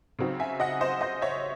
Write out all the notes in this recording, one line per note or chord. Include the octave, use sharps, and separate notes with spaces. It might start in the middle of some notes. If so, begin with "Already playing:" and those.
C#3 F#3 C4 D#4
E5 G#5
D#5 F#5
C5 D#5
C5 D#5
C#5 E5